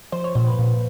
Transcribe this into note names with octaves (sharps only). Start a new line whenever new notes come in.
F3 C5
C#5
A#2 C5
B4
A#2